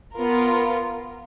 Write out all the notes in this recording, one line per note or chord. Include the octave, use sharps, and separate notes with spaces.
B3 F4 A#4